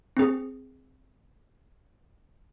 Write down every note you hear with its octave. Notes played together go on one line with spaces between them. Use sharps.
C4 G#4